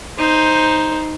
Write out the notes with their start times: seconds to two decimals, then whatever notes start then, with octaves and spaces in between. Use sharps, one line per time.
0.18 D#4 C5